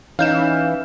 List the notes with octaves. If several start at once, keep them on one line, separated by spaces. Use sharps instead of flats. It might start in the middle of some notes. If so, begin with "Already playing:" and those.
E3 C#4 D#4 F5 G6 E7